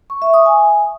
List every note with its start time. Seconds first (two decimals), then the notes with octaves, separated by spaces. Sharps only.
0.10 C#6
0.22 E5
0.34 D#6
0.46 G#5